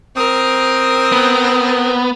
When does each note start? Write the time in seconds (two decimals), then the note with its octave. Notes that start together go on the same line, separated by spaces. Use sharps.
0.16 C4 A#4 D#6
1.12 B3